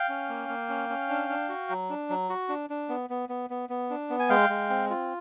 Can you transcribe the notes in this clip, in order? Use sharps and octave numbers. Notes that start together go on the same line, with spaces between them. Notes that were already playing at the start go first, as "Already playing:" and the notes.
Already playing: F5 G5
C#4
A#3
A#3
C#4
C#4
D4
D4
F#4
F#3
D4
F#3
F#4
D4
D4
B3
B3
B3
B3
B3
D4
B3
G#5
G#3 F5 G5
G#3
C4
F4